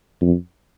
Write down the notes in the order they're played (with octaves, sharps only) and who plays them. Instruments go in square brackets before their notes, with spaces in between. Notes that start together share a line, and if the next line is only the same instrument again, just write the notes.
[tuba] F2